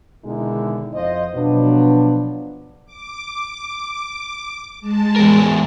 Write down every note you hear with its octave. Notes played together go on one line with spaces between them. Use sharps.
B2 D3 D#3 G#3 D#4 E4
F2 F4 C5 D#5
B2 F3 F#3 B3 D4
D6
G#3 A5
E2 A#4